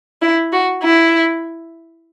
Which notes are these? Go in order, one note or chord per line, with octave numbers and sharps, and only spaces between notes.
E4
F#4
E4